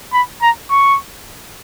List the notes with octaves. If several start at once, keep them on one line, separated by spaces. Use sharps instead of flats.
B5
A#5
C#6